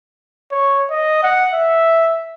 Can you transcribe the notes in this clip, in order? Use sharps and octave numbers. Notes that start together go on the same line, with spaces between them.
C#5
D#5
F#5
E5